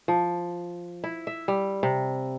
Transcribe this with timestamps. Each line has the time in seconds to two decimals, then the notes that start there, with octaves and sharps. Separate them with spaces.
0.08 F3
1.04 E4
1.27 E5
1.48 G3
1.83 C3